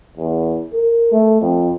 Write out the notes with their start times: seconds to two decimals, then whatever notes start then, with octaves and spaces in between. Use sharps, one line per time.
0.17 E2
0.73 A#4
1.12 A3
1.41 F2